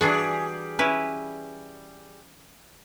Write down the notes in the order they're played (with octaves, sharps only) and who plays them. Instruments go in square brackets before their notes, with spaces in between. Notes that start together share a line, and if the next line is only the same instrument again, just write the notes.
[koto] E3 D4 F#4 [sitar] G3 G#4
[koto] C#4 E4 B4